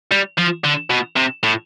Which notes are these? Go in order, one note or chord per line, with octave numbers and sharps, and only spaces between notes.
G3
F3
D3
B2
C3
A2